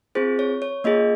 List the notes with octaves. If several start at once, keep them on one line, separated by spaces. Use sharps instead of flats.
C4 F4 G#4 C5
C#5
C#5
A#3 C#4 F4 G#4 D#5